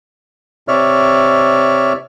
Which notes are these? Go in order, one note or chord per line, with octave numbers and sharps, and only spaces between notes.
C3 C#5 D5 E5 F6